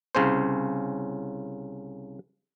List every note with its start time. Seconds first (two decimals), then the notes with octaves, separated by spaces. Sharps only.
0.15 C2 C#3 C#4 C5